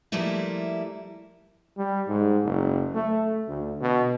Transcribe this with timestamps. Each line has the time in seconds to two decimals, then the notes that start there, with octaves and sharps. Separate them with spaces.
0.12 F3 G3 A3 A#3 E4
1.77 G3
2.08 G#2
2.44 F#1
2.95 A3
3.48 D2
3.81 B2